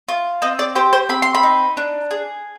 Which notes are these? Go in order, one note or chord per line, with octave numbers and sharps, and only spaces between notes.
F4
C4 D#5
D5
G4 C5
C5
C4 B5
C6
B5
D#4
D4
G#4